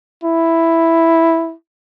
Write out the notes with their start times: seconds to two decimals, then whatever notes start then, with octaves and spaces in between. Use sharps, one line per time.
0.24 E4